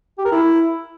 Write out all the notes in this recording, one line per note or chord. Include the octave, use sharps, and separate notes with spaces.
G4
A#4
E4